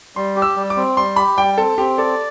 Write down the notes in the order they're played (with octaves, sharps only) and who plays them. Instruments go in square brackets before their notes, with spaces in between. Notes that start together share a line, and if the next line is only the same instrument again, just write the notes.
[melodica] G3 [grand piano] C6
[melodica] G4
[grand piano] E6
[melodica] G3
[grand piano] D6
[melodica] C4
[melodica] G3 [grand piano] C6
[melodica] G4 [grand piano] B5
[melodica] G3 [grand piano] G5
[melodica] C4 [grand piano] A4
[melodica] C4 [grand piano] G4
[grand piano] A4 [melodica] D5